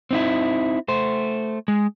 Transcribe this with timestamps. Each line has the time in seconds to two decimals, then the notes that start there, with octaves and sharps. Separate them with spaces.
0.11 C4 D#4 E4
0.88 A3 C5
1.68 G#3